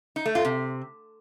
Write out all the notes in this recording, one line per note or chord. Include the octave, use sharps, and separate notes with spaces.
D#4
A3
F4
C3